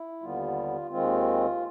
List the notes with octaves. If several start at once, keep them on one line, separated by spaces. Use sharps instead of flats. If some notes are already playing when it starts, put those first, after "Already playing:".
Already playing: E4
D#2 D3 G3 B3 F4
D#2 D#3 G#3 C4 F4